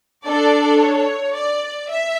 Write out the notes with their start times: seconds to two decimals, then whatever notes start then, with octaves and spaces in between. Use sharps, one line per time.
0.25 D4 A4 D5
0.79 C#5
1.34 D5
1.88 E5